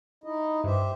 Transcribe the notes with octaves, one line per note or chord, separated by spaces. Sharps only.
D#4 E4 D#5
G2 G4 C5 E5